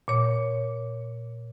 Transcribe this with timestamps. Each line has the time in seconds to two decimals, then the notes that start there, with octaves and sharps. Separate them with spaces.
0.08 A#2 C#5